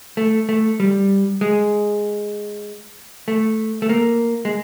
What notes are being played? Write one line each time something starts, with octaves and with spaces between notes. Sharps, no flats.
A3
A3
G3
G#3
A3
A3
A#3
G#3